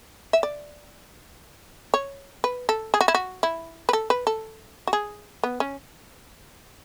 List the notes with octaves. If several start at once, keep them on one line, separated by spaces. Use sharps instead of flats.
E5
D5
C#5
B4
A4
G#4
F#4
E4
F#4
E4
B4
A4
B4
A4
F#4
G#4
B3
C#4